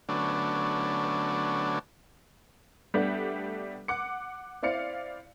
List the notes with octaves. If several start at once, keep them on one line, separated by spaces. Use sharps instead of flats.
D3 F#3 A3 B3 C#4 D4
G3 A3 B3 D4 G4
F#5 D6 C#7
C4 E4 D5 F5 C#7